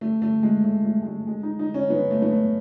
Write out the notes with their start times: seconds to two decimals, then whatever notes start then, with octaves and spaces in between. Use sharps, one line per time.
0.01 A3
0.22 A3
0.43 G#3
0.64 A3
0.85 A3
1.02 G#3
1.07 A3
1.27 G#3
1.43 D#4
1.59 D#4
1.74 C#4
1.90 B3
2.11 A3
2.22 B3
2.32 A3